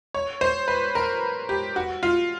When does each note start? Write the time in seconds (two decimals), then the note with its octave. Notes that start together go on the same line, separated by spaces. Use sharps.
0.14 C#5
0.41 C5
0.68 B4
0.95 A#4
1.49 G4
1.76 F#4
2.03 F4